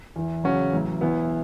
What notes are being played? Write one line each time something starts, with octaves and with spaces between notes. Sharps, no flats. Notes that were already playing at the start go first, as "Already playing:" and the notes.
E2 E3
E2 C#3 F#3 C#4 F#4
A1 A2 F#3
E1 E2 E3 B3 E4